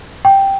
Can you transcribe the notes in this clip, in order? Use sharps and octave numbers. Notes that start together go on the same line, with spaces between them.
G5